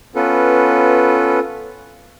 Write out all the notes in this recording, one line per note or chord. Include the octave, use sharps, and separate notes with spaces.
B3 C#4 F4 A4 B4